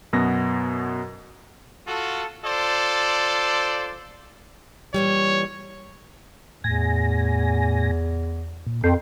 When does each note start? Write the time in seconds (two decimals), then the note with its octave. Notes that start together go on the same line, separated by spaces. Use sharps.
0.13 F#2 B2 B3 A#6
1.86 F4 F#4 A4
2.44 F4 A4 C5 D5
4.94 A#2 E3 G3 C#5
6.64 E2 A2 G#5 A#6
8.67 A#2
8.84 F2 A4 G5 C6